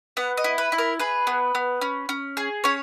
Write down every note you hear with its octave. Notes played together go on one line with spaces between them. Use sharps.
B3 F#5
D#5
E4
B4
E4
A#4
G#4 B4
B3
B3
C#4
C#4
G#4
C#4 C#5